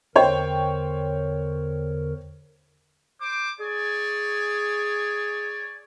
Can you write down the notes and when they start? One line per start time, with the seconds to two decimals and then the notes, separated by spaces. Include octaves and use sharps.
0.16 E2 D3 A#4 C5 C#5 G5
3.20 C5 D6
3.60 G#4 C#5 D5 G#5